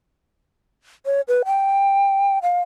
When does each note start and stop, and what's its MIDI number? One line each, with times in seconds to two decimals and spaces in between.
1.06 1.21 73
1.28 1.42 71
1.45 2.39 79
2.43 2.60 77